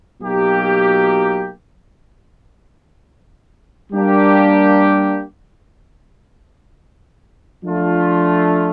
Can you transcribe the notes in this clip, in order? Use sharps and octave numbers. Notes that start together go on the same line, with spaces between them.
B2 F#3 A#3 D#4 G4
G3 A#3 D4 G4
F3 A3 D4 F4